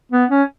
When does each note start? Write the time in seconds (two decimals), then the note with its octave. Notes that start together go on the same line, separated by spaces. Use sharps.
0.12 B3
0.30 C#4